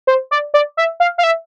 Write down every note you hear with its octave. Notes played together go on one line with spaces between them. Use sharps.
C5
D5
D5
E5
F5
F5
E5